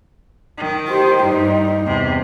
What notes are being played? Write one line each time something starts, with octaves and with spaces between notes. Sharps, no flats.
D#3
G4 C5
G2 D#4
E2 C3